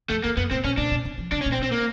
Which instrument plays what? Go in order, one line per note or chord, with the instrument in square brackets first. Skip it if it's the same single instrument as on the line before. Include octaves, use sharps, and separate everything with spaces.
[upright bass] F2 [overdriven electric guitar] A3
[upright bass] E2 [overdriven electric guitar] A#3
[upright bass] F#2 [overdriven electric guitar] B3
[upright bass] A2 [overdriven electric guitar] C4
[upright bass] A#2 [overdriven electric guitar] C#4
[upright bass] A#2 [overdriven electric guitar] D4
[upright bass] B2
C3
F3
[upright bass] C3 [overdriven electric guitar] D4
[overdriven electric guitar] C#4
[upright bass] A#2
[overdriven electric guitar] C4
[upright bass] B2
[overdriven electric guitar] C4
A#3